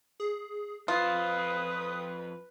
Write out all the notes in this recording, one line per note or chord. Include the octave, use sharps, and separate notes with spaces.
G#4
F2 F4 B4 C5 D#6